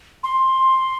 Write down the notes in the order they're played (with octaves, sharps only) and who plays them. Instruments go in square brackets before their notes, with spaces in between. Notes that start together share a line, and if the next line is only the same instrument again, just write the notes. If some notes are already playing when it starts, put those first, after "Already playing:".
[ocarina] C6